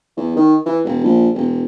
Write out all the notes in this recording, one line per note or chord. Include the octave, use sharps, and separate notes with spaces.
E2
D#3
E3
E1
A#1
E1